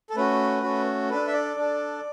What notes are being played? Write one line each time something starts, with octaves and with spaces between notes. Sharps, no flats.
A4
A3 C#4 F#4 B4
A3 C#4 F#4
D4 A4 B4
E5
D5
D4 A4